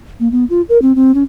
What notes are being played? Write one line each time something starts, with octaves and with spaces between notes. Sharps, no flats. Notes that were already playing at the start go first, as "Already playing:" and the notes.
A#3
B3
F4
A#4
C4
C4
C#4